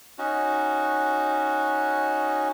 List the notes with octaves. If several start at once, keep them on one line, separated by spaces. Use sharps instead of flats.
C#4 D#4 F#4